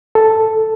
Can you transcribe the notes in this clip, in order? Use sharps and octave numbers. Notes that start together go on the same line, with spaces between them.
A4